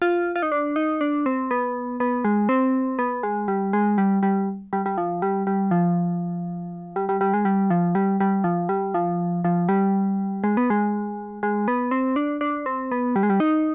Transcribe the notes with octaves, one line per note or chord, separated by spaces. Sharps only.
F4
F4
D#4
D4
D#4
D4
C4
B3
B3
G#3
C4
B3
G#3
G3
G#3
G3
G3
G3
G3
F3
G3
G3
F3
G3
G3
G3
G#3
G3
F3
G3
G3
F3
G3
F3
F3
G3
G#3
B3
G#3
G#3
B3
C4
D4
D4
C4
B3
G3
G#3
G3
D#4